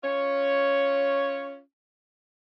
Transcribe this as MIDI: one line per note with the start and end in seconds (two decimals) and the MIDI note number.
0.03 1.59 61
0.03 1.59 65
0.03 1.59 73